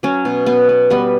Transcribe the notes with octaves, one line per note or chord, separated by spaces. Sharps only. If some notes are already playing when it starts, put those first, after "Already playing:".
F#3 C#4
B2
B2 B3
B3
G3 B3